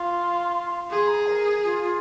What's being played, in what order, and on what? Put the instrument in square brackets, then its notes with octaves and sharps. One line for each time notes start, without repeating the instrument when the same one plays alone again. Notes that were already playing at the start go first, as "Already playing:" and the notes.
Already playing: [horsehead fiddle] F4 [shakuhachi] C6
[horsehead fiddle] G#4 [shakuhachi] C6
[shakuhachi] A#5
A#4
F4
F4